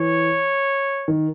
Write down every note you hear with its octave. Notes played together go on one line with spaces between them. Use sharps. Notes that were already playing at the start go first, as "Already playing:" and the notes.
Already playing: E3 C#5
D#3